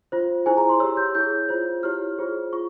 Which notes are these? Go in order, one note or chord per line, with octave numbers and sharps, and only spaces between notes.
F4 C5
E4 G#4 C5 G#5
A#5
C6
G4 C#5 E6
G6
E4 G#4 C#5 G6
F4 C5
E4 G4 C#5 F6
F4 G#4 C5
F4 C#6